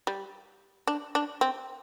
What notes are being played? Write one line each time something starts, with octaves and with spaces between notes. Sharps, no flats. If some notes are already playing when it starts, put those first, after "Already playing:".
G3
D4
D4
C4